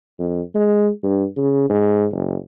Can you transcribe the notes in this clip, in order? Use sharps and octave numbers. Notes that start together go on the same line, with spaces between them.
F2
G#3
G2
C#3
G#2
F#1